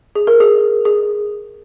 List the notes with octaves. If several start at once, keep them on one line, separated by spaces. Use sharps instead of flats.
G#4
A#4
G#4
G#4